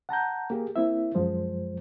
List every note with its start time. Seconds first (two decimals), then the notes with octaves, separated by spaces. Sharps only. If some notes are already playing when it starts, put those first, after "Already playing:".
0.09 F#5 A5 A#5 G6
0.50 A#3 G4 G#4
0.76 A#3 C4 E4 E5
1.15 C2 F#2 F3 G#3 C5